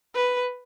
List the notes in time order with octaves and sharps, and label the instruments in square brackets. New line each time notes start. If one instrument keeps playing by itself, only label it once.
[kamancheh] B4